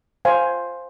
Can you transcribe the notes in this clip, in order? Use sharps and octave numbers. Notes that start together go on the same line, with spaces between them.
C5 F5 G#5